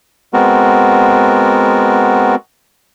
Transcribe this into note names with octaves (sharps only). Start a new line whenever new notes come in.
G#3 B3 C4 F#4 A#4